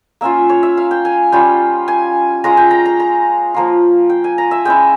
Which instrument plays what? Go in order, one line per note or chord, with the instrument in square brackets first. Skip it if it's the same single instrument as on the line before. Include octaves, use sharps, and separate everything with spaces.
[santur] A#3 C#4 F4 E5
C#5
E5
F5
G5
G#5
G3 C#4 F4 G5
G#5
G#3 C#4 F4 A#5
G5
A#5
A#5
A#5
F3 A#3 F4
G5
G#5
A#5
E5
G#3 C#4 E4 G5